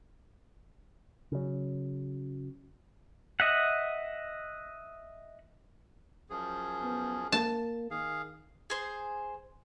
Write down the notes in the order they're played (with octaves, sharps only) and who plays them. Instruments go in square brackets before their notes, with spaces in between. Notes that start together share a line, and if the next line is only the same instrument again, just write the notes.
[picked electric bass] C#3 F#3
[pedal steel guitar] D#5 E5 F#5
[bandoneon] F#2 F3 G#4
[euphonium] B3
[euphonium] A#3 [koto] A5
[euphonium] D#3 [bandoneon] G#4 F5
[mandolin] G#4 C5